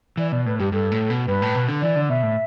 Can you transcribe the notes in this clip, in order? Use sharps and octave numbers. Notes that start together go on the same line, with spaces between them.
E3 D5
B2 D5
A2 B4
G2 G4
G2 A4
A2
B2
G2 B4
A2
B2
D3
E3 D5
D3
B2 E5
A2